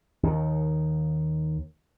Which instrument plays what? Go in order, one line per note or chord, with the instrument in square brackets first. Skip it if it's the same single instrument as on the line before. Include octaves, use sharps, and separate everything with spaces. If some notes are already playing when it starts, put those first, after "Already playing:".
[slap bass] D#2 D#3